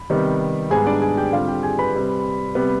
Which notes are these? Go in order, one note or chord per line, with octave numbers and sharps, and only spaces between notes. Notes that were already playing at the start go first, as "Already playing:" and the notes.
Already playing: B5
C3 D#3 G3 B3
G#2 G3 B3 G#4 G#5
D4 D5
G#4 G#5
G4 G5
D3 G3 C4 F4 F5
G4 G5
G#4 G#5
B4 B5
C3 G3 C4
C3 G3 B3